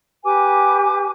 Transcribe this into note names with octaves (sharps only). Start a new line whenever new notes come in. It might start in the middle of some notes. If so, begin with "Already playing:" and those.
G4 B4 G#5 D6